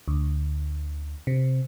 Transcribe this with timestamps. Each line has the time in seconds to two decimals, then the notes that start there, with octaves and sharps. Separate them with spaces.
0.08 D2
1.27 C3